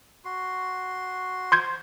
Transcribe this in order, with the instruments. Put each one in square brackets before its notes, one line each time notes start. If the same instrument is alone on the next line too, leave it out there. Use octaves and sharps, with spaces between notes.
[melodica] F#4 C6
[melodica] C5 [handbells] C6 G6 G#6